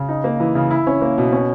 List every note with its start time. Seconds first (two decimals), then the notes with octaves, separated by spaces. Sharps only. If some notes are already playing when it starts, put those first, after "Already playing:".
Already playing: C#3
0.09 D#4
0.24 A#3
0.40 E3
0.55 C#3
0.71 E4
0.87 C#4
1.01 A#3
1.18 B2
1.32 C#4